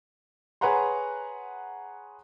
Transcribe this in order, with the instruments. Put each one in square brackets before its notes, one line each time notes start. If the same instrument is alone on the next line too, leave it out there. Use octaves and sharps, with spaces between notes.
[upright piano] G#4 B4 C#5 F#5 A#5 C6